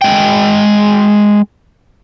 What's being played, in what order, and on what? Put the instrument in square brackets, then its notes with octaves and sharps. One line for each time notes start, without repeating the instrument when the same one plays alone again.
[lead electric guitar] G#3 G5